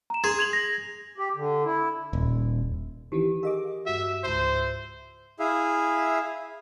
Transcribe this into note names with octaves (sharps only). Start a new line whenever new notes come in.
A#5 E7
G#4 C6
G#6 F7 F#7
A#6
G4
D3
E4
D#1
D#3 E3 C4 G4
G#4 A#4 D#5 F5 D6
G2 F#4 E5
C#2 G#2 E4 F4 C5 E5
E4 G#4 E5 F5